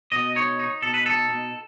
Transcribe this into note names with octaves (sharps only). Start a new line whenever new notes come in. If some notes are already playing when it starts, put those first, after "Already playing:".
B2 D#5
D#4 C#5
D#4
B2 A4
B4
D#4 A4
B2